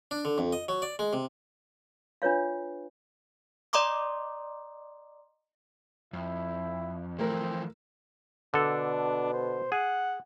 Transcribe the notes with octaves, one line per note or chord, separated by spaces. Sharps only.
D4
D3
F2
D#5
F#3
D5
G#3
C3
D4 F4 B4 C#5 F5
D5 D#5 A#5 C6 D6 D#6
F2 E4
E3 F3 A3 C4 A#4
B2 D3 D4 A4
C5
G#4 F#5